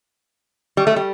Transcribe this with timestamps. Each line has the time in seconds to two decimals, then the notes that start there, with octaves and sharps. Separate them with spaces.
0.77 G3
0.87 A3
0.96 G3